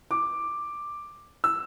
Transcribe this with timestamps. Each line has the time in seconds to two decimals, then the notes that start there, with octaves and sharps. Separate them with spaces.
0.11 D6
1.44 E6